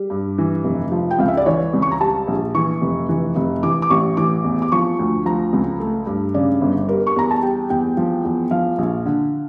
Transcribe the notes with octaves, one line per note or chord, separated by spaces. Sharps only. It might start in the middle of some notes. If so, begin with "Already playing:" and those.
Already playing: G3
G2
E3
F1
F3
G5
C#2 F5
E5
D5
E3 C#5
C#2
C#6
A#5
G3 A5
A#1
E3 C#6
F1
E3
F1
E3 D6
D6
A1 C#6
E3 D6
E2
D6
F3 C#6
D2
F3 A#5
C#2
A3
G2
C#3 D5
G1
G3 A#4
C#6
E2 A#5
A5
G3 G5
E2 G5
F3
E2
F3 F5
A#1
D3